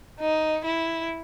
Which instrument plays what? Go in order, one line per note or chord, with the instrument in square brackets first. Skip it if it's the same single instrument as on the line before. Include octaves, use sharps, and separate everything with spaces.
[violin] D#4
E4